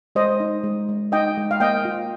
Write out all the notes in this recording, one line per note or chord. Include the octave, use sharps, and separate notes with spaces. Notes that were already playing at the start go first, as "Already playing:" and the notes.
G#3 C5 D#5
D#4
G#3
G#3
D#4 D#5 G5
G#3
F5
A#3 D#5 G5
F4